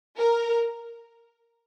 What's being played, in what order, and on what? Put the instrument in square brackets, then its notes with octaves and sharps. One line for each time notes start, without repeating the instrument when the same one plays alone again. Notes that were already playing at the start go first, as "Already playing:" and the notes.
[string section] A#4